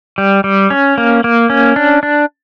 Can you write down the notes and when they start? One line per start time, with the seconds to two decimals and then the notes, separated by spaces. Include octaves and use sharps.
0.18 G3
0.44 G3
0.70 C#4
0.98 A#3
1.24 A#3
1.50 C#4
1.76 D4
2.03 D4